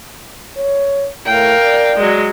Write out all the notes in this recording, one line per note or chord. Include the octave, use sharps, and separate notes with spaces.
C#5
A2 A#4 F5 G5
D5
F#3 G#3